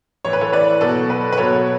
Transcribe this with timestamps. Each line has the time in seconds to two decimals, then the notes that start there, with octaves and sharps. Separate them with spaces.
0.25 A2 E3 C#5
0.33 B4
0.41 A4 C#5
0.53 B4 D5
0.81 B2 F#3 A4
1.10 B4
1.32 B4
1.38 B2 F#3 A4 C#5